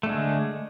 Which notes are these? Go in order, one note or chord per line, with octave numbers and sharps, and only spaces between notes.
D3 G#3 A3